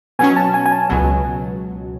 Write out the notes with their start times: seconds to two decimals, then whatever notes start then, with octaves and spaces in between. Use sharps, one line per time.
0.19 B2 F#3 C#4 G#5
0.36 A5
0.54 G#5
0.66 G#5
0.72 A5
0.89 C#2 B2 F#3